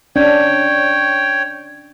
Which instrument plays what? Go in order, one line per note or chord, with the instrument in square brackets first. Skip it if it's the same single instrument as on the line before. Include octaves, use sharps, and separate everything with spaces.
[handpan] C#4 D4 [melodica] C#5 G5